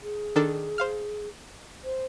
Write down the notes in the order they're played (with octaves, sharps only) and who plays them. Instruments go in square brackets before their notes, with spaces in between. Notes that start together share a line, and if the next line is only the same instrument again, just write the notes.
[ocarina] G#4
[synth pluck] D#3 D4 A4
C5 F5 F6
[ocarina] C5